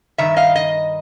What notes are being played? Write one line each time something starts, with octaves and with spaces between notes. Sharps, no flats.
G2 D#3 E5
D#5 F5
D#5